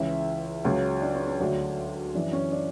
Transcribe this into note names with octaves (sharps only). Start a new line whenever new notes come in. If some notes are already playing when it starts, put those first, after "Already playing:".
Already playing: C#2 C#3 E3 E5
C#2 C#3 F#3 C#5
D4
C#4
C#4
D2 D3 F#3
F#2 E3 D4
C#4
D4